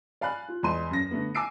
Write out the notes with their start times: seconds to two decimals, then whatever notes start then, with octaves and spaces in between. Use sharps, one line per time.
0.21 D5 F5 G#5 B5 F#6
0.49 F4
0.63 E2 G#3 C6 D#7
0.91 F#2 A#6
1.11 D3 A3 B3
1.35 G#5 D6 E6 C7 D7